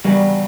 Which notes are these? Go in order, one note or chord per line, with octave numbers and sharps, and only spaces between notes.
E2 C#3 F#3 G3